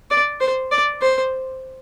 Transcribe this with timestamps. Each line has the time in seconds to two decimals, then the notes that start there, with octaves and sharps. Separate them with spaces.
0.11 D5
0.41 C5
0.71 D5
1.01 C5